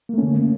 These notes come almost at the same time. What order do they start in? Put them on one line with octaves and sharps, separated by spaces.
A#3 A3 C#4 D3